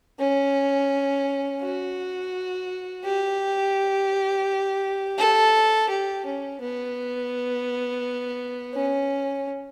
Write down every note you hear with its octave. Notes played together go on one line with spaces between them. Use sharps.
C#4
F#4
G4
A4
G4
C#4
B3
C#4